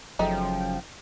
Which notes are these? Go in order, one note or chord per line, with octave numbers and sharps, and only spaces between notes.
F#1 F#2 C#3 F3 A3 D#4 G5